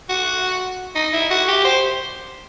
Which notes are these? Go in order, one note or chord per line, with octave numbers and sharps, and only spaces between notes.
F#4
D#4
E4
F#4
G4
C5